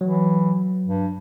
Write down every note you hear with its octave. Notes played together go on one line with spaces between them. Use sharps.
E3 F#3
G2